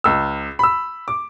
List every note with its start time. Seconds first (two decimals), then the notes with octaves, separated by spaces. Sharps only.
0.04 C#2 E6
0.59 B5 E6
1.08 D6